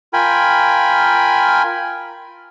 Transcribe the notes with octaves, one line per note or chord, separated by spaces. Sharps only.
F4 A#4 G5 G#5 B5